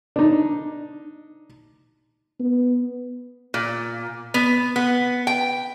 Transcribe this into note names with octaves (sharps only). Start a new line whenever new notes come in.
D4 D#4
B3
A#2
B3
B3
G5